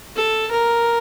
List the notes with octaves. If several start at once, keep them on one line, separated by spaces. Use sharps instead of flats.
A4
A#4